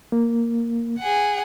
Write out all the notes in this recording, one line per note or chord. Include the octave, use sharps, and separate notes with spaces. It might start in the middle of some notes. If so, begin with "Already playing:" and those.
A#3
G#4 F#5